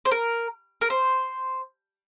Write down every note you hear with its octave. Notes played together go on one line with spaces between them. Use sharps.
C5
A#4
A#4
C5